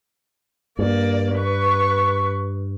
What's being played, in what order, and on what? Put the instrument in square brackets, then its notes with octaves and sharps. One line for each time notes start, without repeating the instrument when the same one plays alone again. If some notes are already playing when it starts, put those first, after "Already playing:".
[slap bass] G2 [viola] A#3 D5
[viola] B4 C#6